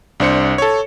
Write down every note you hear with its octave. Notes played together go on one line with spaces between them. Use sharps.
C2 D4 C5 C#7
A4 C#5